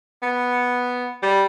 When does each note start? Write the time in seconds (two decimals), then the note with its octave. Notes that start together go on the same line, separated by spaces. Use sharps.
0.22 B3
1.23 G3